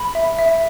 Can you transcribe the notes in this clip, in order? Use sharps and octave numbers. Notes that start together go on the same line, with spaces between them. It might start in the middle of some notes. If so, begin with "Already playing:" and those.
Already playing: B5
E5
E5